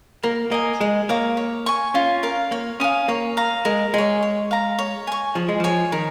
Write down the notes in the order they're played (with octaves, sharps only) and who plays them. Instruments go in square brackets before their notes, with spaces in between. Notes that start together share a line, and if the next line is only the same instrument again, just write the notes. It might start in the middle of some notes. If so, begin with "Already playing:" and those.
[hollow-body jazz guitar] A#3 [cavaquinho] A#4
[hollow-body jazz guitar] A#3 [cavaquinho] D#5 G#5
[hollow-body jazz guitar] G#3 [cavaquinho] G#4
[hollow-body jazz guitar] A#3 [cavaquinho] C#5 F5 A#5
[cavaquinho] C#5
G#5 C#6
[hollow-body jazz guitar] C#4 [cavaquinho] F4
[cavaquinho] A#4 F5
[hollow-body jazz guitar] A#3 [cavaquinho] C#5
[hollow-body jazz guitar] C#4 [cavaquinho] F5 G#5 D#6
[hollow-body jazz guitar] A#3 [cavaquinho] C#5
[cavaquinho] F5 A#5
[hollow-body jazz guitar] G#3 [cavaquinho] A#4
[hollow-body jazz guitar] G#3 [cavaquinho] C#5 G#5
[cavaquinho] C#5
F5 A#5
C#5
G#5 C#6
[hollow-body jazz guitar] F3 [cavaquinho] G#4
[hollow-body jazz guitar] G#3
[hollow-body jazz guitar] F3 [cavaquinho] C#5 G#5
[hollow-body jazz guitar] D#3 [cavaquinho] A#4